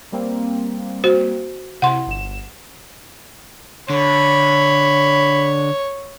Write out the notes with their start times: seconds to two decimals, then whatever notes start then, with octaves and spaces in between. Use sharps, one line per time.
0.12 G3 A#3 C4
1.04 F#4 C5
1.82 C3 E4 F#5 C6
2.07 G1 E7
3.90 D3 C#5 B5